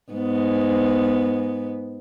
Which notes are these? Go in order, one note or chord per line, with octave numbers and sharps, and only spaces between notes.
G#2 B3